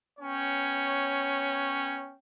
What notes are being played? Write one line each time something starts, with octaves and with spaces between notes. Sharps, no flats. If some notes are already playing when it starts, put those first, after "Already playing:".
B3 C#4 C#5 G5